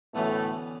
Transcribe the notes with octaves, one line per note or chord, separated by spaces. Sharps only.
D2 A2 C#3 E3 A3 B3